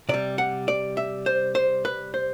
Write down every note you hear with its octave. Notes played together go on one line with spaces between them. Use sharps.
C3 G3 D5
F#5
D5
E5
C5
C5
B4
C5